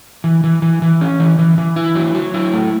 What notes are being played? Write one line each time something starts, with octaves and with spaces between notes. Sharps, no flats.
E3
E3
E3
E3
C#4
E3
E3
E3
E4
F#3
F#3
E4
A3